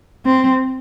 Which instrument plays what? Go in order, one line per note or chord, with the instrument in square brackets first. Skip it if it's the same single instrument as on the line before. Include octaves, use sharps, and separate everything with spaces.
[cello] C4